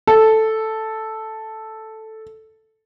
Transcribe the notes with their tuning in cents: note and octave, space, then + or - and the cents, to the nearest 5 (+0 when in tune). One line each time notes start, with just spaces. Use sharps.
A4 +0